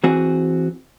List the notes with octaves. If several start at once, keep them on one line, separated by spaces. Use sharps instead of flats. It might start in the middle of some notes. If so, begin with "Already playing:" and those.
E3 C4 F#4 G#4